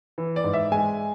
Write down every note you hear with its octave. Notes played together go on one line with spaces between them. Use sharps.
E3
D5
G#2
E5
G#3 G#5